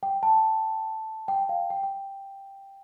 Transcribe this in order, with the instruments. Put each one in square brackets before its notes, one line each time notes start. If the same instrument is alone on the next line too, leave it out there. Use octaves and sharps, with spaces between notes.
[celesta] G5
A5
G5
F5
G5
G5